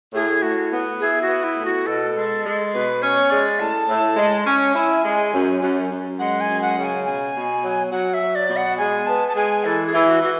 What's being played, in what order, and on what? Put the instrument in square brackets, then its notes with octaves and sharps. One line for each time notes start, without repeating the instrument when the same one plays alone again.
[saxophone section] A2 [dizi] G#4
[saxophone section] A2 [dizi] F#4
[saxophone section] B3
[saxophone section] E4 [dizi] G#4
[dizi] F#4
[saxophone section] B3
[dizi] E4
[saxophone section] A2
[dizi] F#4
[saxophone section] B2 [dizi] A4
[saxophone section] G#3
G#3
[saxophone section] B2 [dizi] B4
[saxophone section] C#4 [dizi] C#5
[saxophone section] G#3 [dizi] D5
[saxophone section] A2 [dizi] A5
[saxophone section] A2
G#3
[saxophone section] C#4 [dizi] G#5
[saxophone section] E4
G#3
F#2
F#2
F#2
[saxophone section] G#3 [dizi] F#5
[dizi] G#5
[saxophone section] F#2
[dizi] F#5
[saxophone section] C#3
[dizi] G#5
[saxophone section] B2 [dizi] G#5
[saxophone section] B2
F#3
[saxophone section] F#3 [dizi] F#5
[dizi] E5
[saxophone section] F#3
[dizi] D5
[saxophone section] B2
[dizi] F#5
[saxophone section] G#3 [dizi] G#5
[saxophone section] B3 [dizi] A5
[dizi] A5
[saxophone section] G#3 [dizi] G#5
[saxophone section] E3 [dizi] A4
[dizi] G#4
[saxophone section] E3
[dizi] F#4
[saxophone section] E3 [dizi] F#4